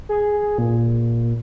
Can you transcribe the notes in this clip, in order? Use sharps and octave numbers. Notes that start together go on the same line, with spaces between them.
G#4
A#2